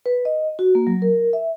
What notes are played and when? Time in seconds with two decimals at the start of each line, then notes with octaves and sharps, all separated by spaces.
0.06 B4
0.25 D#5
0.59 F#4
0.75 A#3
0.87 F#3
1.02 A#4
1.33 E5